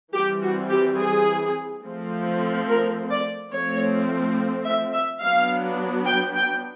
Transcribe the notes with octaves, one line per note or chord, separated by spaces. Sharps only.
E3 G3 C4 G4
F#4
G4
G#4
F3 A3 C4
A#4
D5
F3 A3 C4 C#5
E5
E5
F#3 B3 D4 F5
G5
G5